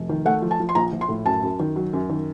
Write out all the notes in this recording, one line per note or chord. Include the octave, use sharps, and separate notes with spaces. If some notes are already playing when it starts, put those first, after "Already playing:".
Already playing: F1
D#3
A3 F#5
F3
A5
F3
C6
A#1 A#5
A#1
C6
A2
F#2 A5
F#2
D#3
F#3
F#2
D#3